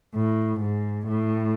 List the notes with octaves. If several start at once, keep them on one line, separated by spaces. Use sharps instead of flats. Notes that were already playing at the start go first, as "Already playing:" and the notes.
A2
G#2
A2